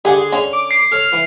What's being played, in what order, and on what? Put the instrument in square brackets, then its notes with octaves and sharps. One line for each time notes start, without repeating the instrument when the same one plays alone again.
[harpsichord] D3 D4 [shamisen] G4 F#5 [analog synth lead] G#4
[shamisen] D3 [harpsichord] C#4 F5
[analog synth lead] D6
[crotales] C7
[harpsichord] A4 C#5 [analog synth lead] F6
[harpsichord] E3 F5